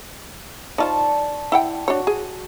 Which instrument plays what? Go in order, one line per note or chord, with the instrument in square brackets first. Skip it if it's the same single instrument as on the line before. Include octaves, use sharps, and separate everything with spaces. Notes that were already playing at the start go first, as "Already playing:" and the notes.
[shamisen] D#4 F4 C5 [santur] D5 A5 C#6
[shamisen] E4 F#5 G5
[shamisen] D4 C#5 [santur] F#4
[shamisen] G#4